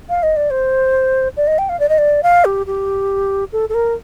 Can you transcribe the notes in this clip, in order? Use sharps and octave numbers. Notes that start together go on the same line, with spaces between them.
F5
D#5
D5
C5
D5
D#5
G5
F5
D5
D#5
D5
F5
G4
G4
A4
A4
A#4